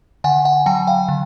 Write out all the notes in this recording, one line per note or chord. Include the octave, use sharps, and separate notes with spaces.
D3 F#5 G#5
F#5 G#5
F#3 G5 A5
F5 G5
D3